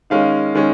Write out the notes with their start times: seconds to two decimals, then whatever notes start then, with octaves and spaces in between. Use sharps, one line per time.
0.10 D#3 G#3 C#4 F5
0.55 D#3 G#3 C#4